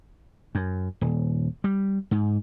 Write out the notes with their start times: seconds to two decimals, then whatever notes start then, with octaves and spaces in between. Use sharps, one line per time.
0.55 F#2
1.01 D#1
1.64 G3
2.11 G#2